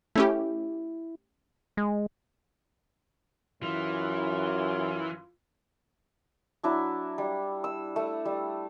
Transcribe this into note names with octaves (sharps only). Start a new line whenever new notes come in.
A3 C#4 E4 G4
G#3
F#2 E3 F4
F#3 D4 E4
G3
E6
A3
G3